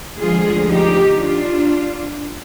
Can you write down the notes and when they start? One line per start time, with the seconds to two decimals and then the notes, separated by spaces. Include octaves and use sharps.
0.18 D2 D3 F3 G#3 F4 G#4
0.68 D#4 G4
1.17 D4 F4